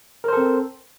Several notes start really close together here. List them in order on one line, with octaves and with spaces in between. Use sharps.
A#4 C5 A4 C4